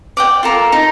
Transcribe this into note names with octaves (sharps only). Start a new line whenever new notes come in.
D5 F#5 G5
F4 A4 A#4
D#4